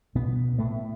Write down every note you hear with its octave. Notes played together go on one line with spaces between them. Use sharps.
B2 B3
A2 A3